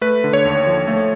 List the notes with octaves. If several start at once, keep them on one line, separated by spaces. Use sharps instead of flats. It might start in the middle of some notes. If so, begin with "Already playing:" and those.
A3 B4
D3
C#5
D#2
F3
A3